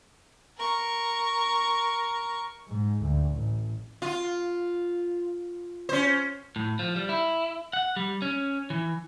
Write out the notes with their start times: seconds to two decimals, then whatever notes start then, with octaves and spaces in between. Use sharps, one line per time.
0.57 A#4 C#6
2.67 G#2
3.02 D2
3.35 A1
4.02 F4
5.89 C#4 C5
6.56 A2
6.79 F3
6.96 G3
7.09 E4
7.73 F#5
7.97 G3
8.22 C#4
8.70 E3